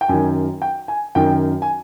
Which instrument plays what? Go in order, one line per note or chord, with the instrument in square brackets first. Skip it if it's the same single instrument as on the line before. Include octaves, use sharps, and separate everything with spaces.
[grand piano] G5
F#2 D#3 G#5
G5
G#5
F#2 D#3 G5
G#5